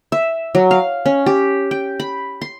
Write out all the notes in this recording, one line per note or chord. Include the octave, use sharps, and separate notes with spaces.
E5
F#3
F5
C#4
G4
G5
B5
C6